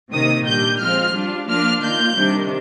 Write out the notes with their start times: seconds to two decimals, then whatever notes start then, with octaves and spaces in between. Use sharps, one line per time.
0.12 C3 D#3 A#3 D#4 D#6
0.45 A#2 G3 D4 G6
0.80 F3 G#3 C4 F4 F6
1.14 G3 D4 F4
1.48 F3 A#3 D4 F4 F6
1.81 D#3 A#3 F4 G6
2.15 C3 D#3 G3 D4